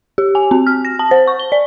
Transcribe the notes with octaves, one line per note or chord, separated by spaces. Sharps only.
G4
G#5
C4
F6
A#6
A5
C5
C#6
G7
D5